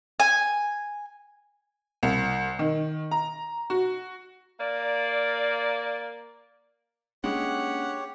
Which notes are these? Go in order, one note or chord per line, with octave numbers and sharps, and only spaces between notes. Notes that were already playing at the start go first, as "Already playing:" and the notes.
G#5
C2
D#3
A#5
F#4
A#3 D5
G#3 A#3 C#4 D4 G4 C#5 F#5